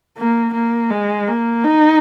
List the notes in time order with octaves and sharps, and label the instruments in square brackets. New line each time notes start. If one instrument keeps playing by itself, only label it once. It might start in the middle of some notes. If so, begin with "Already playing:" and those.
[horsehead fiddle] A#3
A#3
G#3
A#3
D#4